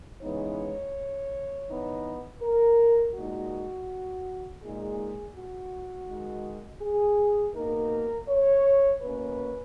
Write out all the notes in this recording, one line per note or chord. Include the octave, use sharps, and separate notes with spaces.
C#3 E3 G#3 B3 D#4 C#5
E3 B3 D#4
A#4
A#2 G#3 D#4 F#4
A#2 G#3 D#4 G#4
F#4
D#3 G#3 D#4
G#4
B2 A#3 D#4 A#4
C#5
B2 A#3 C#4 B4